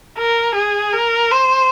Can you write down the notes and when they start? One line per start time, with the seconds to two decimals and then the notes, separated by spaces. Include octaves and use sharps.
0.18 A#4
0.55 G#4
0.93 A#4
1.31 C5